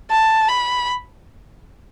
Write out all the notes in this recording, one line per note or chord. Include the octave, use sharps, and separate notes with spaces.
A5
B5